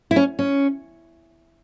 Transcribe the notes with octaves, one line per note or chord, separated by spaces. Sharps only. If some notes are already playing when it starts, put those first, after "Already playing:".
E4
C#4
C#4